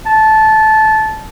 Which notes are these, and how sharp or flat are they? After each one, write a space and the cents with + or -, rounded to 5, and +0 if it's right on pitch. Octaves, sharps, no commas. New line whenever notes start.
A5 -15